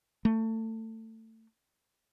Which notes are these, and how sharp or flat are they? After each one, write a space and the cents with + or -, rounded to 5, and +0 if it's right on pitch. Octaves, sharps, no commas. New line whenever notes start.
A3 +25